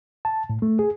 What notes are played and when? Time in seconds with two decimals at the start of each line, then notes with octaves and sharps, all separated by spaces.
0.25 A5
0.50 A2
0.62 A3
0.79 G#4